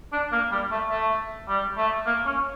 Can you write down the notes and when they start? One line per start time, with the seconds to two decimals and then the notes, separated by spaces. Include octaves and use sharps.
0.13 D4
0.32 A#3
0.52 G3
0.71 A3
0.90 A3
1.48 G3
1.77 A3
2.06 A#3
2.26 C#4